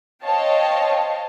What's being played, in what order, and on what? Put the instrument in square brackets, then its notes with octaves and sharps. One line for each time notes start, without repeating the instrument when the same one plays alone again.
[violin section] C5 C#5 D#5 F5 G5 A5